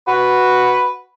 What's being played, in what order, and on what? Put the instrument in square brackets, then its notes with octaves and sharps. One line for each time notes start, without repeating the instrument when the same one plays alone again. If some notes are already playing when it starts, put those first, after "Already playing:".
[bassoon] F#4 [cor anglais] B4